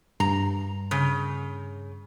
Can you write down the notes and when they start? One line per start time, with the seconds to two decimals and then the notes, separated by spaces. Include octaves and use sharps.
0.20 G2 A#5
0.91 C#3